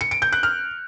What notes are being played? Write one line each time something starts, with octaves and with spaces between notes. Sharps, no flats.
C#7
D7
G6
F#6
F6